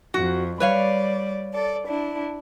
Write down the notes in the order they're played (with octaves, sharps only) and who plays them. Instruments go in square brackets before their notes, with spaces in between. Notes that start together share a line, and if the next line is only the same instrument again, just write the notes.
[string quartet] F2 [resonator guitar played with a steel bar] F#4
[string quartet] G3 D5 [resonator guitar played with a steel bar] B4 C#5 F5
[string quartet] A4 D5
D4 E4